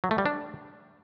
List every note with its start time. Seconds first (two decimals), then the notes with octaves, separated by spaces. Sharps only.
0.04 F#3
0.11 A3
0.18 G3
0.26 D4